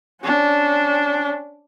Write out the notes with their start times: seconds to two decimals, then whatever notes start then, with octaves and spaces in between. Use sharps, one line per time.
0.22 C#4 D4